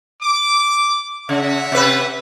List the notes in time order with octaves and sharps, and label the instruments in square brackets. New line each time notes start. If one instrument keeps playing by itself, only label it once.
[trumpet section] D6
[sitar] C#3 [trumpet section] E5 F#5
[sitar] C3 B4